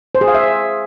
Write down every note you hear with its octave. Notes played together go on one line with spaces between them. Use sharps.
C5
G#4
F5
E5